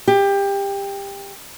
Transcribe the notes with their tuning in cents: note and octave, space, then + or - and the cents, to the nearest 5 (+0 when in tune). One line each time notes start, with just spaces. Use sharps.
G4 +20